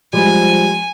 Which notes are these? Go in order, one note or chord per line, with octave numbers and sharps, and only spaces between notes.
F3 G3 G#3 G#5